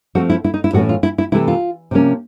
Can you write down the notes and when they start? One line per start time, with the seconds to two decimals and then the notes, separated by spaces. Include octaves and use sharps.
0.15 F3 A3 C4 F#4
0.30 E4
0.44 E4
0.54 D#4
0.64 E4
0.73 A2 E3 A3 C#4 F#4
0.89 F4
1.03 E4
1.18 E4
1.32 C3 E3 A3 E4
1.48 F4
1.91 C3 F3 A#3 C#4